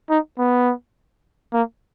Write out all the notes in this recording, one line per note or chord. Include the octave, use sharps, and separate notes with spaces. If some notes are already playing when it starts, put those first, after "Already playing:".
D#4
B3
A#3